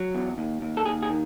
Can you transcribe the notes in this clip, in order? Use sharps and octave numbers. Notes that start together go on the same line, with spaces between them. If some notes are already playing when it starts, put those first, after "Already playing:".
Already playing: F#3
E2
D#2
D#2
A4
D#2 G#4
G#4
D#3